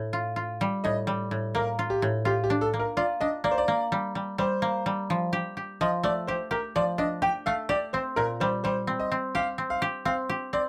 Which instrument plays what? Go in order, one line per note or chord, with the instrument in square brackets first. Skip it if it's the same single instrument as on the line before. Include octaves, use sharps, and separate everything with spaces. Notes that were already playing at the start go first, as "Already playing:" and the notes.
Already playing: [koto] A2
F4
F4
G3
[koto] A2 [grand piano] D#5
[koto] G3
A2
[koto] A#3 [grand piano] A#4
[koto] F4
[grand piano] G4
[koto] A2
[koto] F4 [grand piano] G4
[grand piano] G4
[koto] D4
[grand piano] A4
[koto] A#3
[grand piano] A#4
[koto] F4 [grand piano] D5
[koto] D4 [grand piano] D#5
[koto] A#3 [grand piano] D5
[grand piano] C5
D5
[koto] A#3
G3
G3
[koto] G3 [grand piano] C5
[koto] A#3
G3
F3
G4
G4
[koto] F3 [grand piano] D#5
[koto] A3 [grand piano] D5
[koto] G4 [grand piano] C5
[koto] G4 [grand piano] A#4
[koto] F3 [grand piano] D5
[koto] D4 [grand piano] D#5
[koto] G4 [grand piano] G5
[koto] A3 [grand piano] F5
[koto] G4 [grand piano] D5
[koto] C4 [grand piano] C5
[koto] A#2 [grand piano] A#4
[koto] G3 [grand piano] C5
[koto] G3 [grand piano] C5
[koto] C4
[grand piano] D#5
[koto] C4
[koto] G4 [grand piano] F5
[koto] C4
[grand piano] F5
[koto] G4
[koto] C4 [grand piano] F5
[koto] G4
[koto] C4 [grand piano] D5